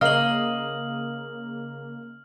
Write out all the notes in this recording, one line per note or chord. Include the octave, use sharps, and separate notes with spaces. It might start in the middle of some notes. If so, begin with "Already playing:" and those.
C#3 A#3 D#5 F5 F6 F#7